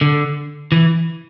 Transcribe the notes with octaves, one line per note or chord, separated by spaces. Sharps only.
D3
E3